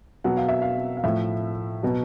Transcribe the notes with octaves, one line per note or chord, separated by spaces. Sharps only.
B2 F#3 F#5
F5
E5
F5
F5
A2 F3 E5
B2 F#3